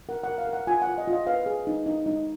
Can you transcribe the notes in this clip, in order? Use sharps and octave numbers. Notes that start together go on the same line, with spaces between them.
A#4 F#5
F#5
A#4
F5
A#4
F#5
F4 G#5
F#5
F4
D#5
F4
D#5
B4 F5
G#4
D#4
D#4
D#4